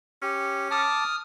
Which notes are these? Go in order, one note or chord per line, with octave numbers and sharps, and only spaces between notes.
C#4 G4
A5 D6 D#6 F6